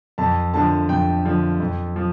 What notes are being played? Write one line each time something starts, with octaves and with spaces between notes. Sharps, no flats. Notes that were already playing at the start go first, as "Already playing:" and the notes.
F2 A5
D3 F3 A5
F2 G5
D3 F3
F2
F3